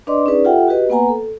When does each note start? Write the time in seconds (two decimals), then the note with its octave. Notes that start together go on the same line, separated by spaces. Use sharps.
0.07 D4 B4 D5 D#5 C6 D6
0.26 C#4 D#4 G#4 B4 D5
0.45 F4 G4 A4 E5 F#5 G5
0.68 F#4 G4 B4 D#5
0.89 A#3 B3 B4 F#5 G#5 A#5
1.09 A4